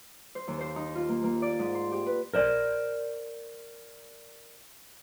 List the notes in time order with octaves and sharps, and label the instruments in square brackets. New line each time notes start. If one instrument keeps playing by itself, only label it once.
[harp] C5
D#2
C5
D#4
F4
A#3
A#3
D5
G#2
C6
G4
B4
[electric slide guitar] A#4 C5 D5